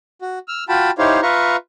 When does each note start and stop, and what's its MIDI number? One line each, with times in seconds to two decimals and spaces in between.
0.22 0.39 66
0.48 0.64 88
0.48 0.64 89
0.69 0.91 65
0.69 0.91 66
0.69 0.91 79
0.69 0.91 81
0.69 0.91 83
0.98 1.21 63
0.98 1.21 64
0.98 1.21 67
0.98 1.21 72
0.98 1.21 73
0.98 1.21 77
1.22 1.56 65
1.22 1.56 71
1.22 1.56 76
1.22 1.56 77
1.22 1.56 82
1.22 1.56 85